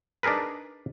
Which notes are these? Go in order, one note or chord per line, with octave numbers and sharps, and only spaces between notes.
D4 D#4 G#4 A#4 B4